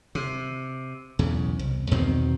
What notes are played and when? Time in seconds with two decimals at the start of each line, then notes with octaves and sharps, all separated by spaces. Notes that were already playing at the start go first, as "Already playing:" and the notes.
0.15 C3
1.19 B1 E2 C#3
1.59 C2
1.91 E2 B2 D#3 C4